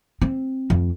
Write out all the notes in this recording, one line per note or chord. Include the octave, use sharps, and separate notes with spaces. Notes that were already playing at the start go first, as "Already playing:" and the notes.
C4
F2